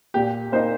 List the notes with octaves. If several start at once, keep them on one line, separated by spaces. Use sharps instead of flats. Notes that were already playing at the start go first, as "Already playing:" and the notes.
A#2 G4
A#3 D#4 C5